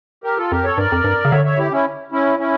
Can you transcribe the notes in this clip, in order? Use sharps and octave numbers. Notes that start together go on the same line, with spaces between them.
G4 A#4
F4 A4
F2 G4 A#4
A4 C#5
G2 A#4 D5
F2
G2
C#3 F5
D3 C#5 E5
C#5 E5
E4 G4
C#4 E4
C#4 E4
C#4 E4